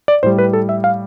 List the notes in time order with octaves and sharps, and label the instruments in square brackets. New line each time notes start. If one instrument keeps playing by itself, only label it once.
[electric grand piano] D5
A2 G3 C5
B4
A4
E5
F5